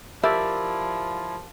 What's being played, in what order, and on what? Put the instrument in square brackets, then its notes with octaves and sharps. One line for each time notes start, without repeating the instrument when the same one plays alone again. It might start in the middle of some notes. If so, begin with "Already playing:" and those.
[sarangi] F3 [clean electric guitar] E4 D5 [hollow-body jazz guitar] G4 A#4 A5 [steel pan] E5